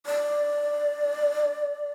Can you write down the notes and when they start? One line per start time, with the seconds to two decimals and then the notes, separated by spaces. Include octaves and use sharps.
0.06 D5